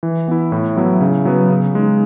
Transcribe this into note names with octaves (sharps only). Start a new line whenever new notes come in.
E3
B3 E4
A2
F#3 B3 E4
C#3
F#3 B3
C#3
G#3 D#4